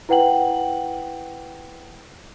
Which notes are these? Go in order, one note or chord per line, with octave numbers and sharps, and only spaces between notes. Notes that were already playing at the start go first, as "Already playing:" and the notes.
E4 B4 F#5 G5 F#7